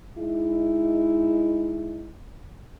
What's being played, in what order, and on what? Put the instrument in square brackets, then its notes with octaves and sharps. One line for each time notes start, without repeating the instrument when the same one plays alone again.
[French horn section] G#3 D#4 E4